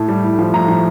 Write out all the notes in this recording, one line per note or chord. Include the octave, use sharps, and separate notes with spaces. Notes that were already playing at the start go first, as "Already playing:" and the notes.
Already playing: A2 A5
G3
A2
F3
A2 A#5
F3